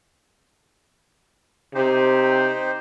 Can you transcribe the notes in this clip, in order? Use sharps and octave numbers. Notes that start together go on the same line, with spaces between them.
C3 D#4 G4 C5